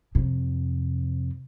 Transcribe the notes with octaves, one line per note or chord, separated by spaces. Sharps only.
F2 C3